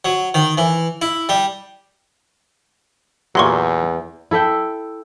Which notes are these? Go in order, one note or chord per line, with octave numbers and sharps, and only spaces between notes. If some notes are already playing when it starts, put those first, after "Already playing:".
F#3
D#3
E3
E4
G3
E2 A#2 F#3 G4 C6 C#6
E4 A4 E5 G5